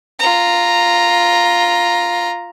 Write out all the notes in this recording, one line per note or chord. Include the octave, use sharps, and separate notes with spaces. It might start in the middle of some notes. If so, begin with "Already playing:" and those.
F4 A#5